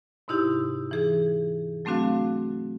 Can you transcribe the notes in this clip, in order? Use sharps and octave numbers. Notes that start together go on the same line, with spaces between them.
G#2 C3 D#4 E4 G4
E3 G#4
F#3 A3 C4 D4 F#4 F5